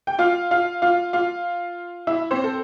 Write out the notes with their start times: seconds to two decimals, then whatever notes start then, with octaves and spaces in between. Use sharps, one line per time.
0.07 G5
0.19 F4 F5
0.51 F4 F5
0.82 F4 F5
1.13 F4 F5
2.07 E4 E5
2.31 C4 C5
2.44 A4